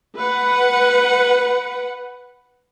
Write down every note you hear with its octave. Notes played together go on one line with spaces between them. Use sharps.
B4 F#5